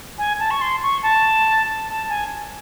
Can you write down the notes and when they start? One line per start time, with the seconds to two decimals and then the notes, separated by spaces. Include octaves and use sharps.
0.18 G#5
0.39 A5
0.51 C#6
0.61 C6
0.83 C#6
1.03 A5
1.88 A5
2.09 G#5